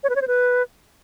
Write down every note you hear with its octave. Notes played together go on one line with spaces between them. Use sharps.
C#5
B4
C#5
C5
B4